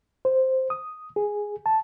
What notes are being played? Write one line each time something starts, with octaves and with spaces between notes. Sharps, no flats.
C5
D#6
G#4
A5